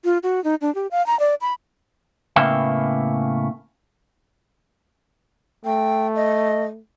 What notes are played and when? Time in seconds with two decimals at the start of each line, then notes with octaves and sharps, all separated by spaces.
0.05 F4
0.23 F#4
0.44 D#4
0.61 D4
0.75 G4
0.91 F5
1.06 A#5
1.20 D5
1.41 B5
2.36 A2 C#3 A#3 B3 E5 G5
5.65 A3 G5
6.16 D#5